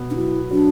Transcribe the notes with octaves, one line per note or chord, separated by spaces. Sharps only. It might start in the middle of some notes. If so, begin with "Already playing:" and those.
Already playing: B2 B3
D4
F#3 E4
F#3 D4